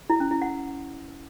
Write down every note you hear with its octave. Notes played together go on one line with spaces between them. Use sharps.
E4
C#4
E4
F#5